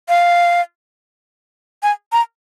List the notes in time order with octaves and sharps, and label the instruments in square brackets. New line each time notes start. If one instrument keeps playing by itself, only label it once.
[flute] F5
G#5
A#5